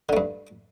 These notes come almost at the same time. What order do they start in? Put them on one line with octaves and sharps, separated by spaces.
D3 A3 G2